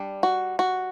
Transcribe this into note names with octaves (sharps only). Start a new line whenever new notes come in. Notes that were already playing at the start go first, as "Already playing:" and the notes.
Already playing: G3 D4
F#4
F#4